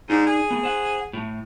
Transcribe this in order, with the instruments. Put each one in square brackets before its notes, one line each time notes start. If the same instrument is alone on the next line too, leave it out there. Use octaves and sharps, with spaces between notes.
[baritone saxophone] G#2 [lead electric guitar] D4 D#4
[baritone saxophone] G#4
[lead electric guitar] A3 B3
C5 F#5
A2 A3